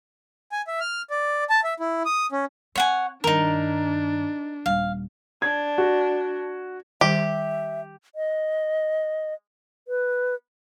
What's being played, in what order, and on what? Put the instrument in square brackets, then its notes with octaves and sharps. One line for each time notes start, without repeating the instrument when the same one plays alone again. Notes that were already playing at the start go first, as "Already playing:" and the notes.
[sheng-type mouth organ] G#5
E5
F6
D5
A5
E5
E4
D#6
C#4
[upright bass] C4 [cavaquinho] C#5 F#5 G#5
[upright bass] G2 D#3 [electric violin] D4 [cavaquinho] D#4 A#4
[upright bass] D#1 G3 [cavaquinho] F5
[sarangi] D4 [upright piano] G#6
[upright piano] F#4
[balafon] D#3 G3 [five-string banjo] G4 [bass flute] E5
[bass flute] D#5
B4